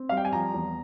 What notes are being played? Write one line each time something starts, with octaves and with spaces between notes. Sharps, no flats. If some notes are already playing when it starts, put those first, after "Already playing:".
Already playing: C4
G3 F5
G5
G#5
F3 A#5
E2